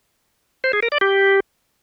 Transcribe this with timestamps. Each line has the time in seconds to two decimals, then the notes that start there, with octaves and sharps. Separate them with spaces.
0.64 C5
0.73 G#4
0.83 A#4
0.92 D5
1.01 G4